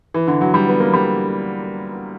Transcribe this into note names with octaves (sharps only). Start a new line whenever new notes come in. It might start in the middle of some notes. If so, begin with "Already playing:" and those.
E3
D3
F#3
G3
B3
A#3
G3